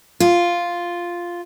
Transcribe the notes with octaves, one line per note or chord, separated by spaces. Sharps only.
F4